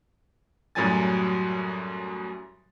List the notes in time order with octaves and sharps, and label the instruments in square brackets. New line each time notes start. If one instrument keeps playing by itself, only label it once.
[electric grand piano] F#2 A2 F#3 G3 G#5 A6